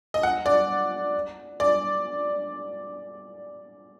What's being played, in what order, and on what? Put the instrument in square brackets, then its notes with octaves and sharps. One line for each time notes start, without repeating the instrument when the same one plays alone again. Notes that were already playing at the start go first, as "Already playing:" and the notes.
[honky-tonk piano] D#5
F#5
D5
D5